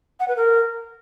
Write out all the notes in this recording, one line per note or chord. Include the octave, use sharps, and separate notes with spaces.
F#5
B4
A#4